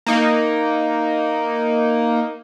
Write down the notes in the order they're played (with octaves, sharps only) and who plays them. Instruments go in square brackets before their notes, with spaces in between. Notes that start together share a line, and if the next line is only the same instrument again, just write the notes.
[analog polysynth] A#3 D#4